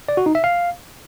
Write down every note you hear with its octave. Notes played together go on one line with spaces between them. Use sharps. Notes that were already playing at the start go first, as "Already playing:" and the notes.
D5
F#4
D#4
E5
F5